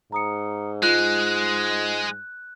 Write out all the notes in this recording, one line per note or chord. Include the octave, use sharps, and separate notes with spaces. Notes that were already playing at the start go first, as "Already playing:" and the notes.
G#2 A#5 D#6 C#7
G#3 F4 F#6